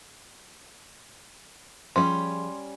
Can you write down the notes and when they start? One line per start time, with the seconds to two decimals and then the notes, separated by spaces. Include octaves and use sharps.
1.96 F3 G3 C#4 G#4 C#5 C6